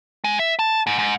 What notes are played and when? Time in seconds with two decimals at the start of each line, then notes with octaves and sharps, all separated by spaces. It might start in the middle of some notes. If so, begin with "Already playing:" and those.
0.24 G#3
0.39 E5
0.59 A5
0.87 G#2
0.99 G#2